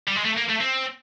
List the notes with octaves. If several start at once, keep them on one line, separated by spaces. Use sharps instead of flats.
G3
G#3
A3
A#3
A3
C4